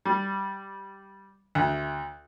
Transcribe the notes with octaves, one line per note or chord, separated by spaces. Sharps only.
G3
D2